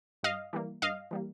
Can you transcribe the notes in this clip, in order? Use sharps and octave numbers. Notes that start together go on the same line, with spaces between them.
G2 D#5 F5
E3 G3 A#3
G2 D#5 F5
E3 G3 A#3